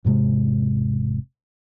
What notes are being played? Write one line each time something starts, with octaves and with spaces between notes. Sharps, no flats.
E1 G#2 C3 G#3